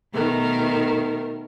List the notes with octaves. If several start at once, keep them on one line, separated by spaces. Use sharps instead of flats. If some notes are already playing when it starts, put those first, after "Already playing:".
B2 D#3 A3 A#4